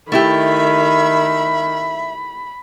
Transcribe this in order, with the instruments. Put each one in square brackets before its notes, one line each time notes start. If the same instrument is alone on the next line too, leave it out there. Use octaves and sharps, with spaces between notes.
[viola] D#3 [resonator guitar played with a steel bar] A3 E4 G4 [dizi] E5 [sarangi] B5